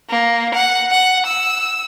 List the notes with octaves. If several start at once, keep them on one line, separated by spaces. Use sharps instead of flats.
A#3
F#5
F#5
E6